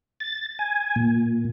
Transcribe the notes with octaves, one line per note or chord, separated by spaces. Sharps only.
A6
G#5
A#2